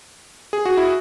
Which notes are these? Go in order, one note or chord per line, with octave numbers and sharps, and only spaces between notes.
G#4
F#4
E4